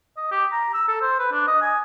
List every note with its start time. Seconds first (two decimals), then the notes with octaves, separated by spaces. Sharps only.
0.17 D#5
0.31 G4
0.52 A#5
0.74 E6
0.88 A4
1.02 C5
1.19 B4
1.32 D4
1.47 D#5
1.62 G#5